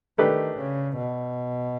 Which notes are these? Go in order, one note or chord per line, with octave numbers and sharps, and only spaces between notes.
D#3 A3 D4 G4 B4
C#3
B2